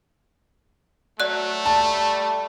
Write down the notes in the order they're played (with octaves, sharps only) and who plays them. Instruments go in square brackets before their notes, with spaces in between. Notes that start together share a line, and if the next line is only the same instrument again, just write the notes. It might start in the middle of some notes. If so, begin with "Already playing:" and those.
[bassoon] F#3 [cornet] A3 [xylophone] D5 F#6
[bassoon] G3 [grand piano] A5